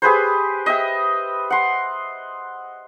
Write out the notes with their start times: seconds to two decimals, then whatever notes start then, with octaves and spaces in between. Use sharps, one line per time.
0.02 G4 G#4 B4 C5
0.66 D#5 E5 G5
1.50 F#5 C6